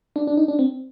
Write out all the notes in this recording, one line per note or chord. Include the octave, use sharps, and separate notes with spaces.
D4
D4
D#4
D4
C4